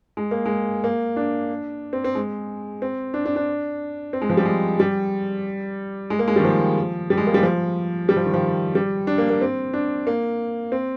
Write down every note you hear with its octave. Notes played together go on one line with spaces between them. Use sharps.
G#3
A#3
G#3
A#3
D4
C4
C4
G#3
C4
D4
D4
D4
C4
G#3
F3
G3
G#3
G3
G#3
A#3
G#3
G3
D#3
F3
G3
G#3
A#3
G3
F3
G3
F3
D#3
F3
G3
D4
A#3
A#3
C4
D4
A#3
C4